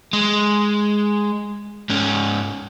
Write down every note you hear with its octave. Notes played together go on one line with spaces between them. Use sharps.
G#3
G#2 C#4